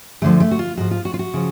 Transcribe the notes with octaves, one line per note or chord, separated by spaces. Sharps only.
D2 D3 F3 A3
A3
F#4
F4
G#2 F3 F#4
F4
F#4
F4
F#4
C#3 F3